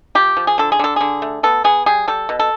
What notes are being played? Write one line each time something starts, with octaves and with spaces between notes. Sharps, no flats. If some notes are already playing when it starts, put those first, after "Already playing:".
F3 G4
F3
G#4
D3 A4
G#4
D3 A4
D3 G#4
A3
B3 A4
B3 G#4
G3 G#4
G3 A4
B2
A4